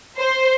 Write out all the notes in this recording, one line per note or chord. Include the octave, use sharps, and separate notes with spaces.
C5